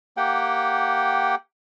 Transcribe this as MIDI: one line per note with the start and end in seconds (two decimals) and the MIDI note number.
0.17 1.35 58
0.17 1.35 67
0.17 1.35 78
0.17 1.35 79